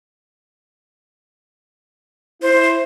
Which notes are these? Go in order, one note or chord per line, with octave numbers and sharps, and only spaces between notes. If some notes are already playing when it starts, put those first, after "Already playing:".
E4 C5